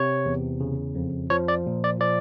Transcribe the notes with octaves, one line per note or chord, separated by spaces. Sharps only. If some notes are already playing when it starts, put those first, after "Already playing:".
Already playing: C3 C#5
E2
C#3
F2
F3 C#5
D5
A#2
D5
F3 D5